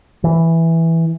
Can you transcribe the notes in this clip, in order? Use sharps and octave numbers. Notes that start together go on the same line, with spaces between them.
E3